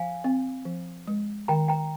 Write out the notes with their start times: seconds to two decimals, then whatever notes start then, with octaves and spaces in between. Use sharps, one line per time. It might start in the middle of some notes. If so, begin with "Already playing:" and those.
Already playing: F3 F5 G#5
0.24 C4
0.65 F3
1.07 G#3
1.48 D#3 G5 A#5
1.68 G5 A#5